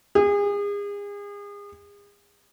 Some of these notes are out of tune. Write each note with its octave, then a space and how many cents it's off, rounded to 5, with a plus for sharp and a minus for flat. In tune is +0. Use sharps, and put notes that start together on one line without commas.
G#4 -35